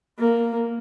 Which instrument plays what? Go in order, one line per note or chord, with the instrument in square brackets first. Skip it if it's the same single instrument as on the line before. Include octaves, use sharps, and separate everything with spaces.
[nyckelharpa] A#3